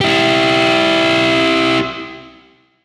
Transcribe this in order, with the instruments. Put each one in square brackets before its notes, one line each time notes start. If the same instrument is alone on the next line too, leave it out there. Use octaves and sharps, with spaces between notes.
[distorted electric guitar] E4 G4